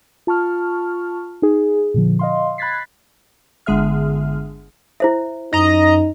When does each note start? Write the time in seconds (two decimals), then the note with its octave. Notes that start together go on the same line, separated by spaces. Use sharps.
0.27 F4 A5 C#6 F6
1.42 D#4 G#4
1.94 A#2 D3 F3
2.19 D#5 F5 C6
2.58 B5 F#6 G#6 A6 B6 C7
3.66 G1 D3 G#3 G#4 E5 F6
5.00 E4 C5 E5
5.53 F#2 D#4 D#5 A#5